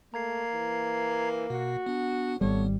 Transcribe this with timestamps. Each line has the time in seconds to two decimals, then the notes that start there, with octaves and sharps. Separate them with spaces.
0.14 A3 A#3 A#5 G#6 C7
0.52 E3
1.50 B2 F#4
1.86 B3 D4
2.41 G#1 G3 A3 B3 C#5